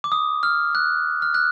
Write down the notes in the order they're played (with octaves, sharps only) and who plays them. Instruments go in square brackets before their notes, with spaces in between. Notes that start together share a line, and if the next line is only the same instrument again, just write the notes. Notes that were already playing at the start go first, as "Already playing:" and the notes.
[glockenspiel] D6
D#6
F6
F#6
F6
F#6